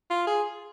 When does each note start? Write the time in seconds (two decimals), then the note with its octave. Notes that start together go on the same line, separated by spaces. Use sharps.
0.10 F4
0.27 G#4